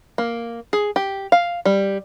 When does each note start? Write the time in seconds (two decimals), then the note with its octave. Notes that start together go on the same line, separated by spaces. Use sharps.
0.18 A#3
0.73 G#4
0.96 G4
1.32 F5
1.65 G3